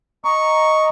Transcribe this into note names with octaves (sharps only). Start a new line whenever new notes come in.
D#5 A#5 C#6